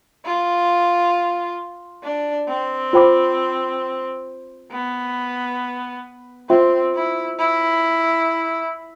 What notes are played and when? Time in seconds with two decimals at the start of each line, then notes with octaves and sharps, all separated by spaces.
0.25 F4
2.03 D4
2.48 C4
2.93 F4 C5 G5 B5 D6
4.72 B3
6.49 C4 F4 C5 E5 G5 C6
6.95 E4
7.39 E4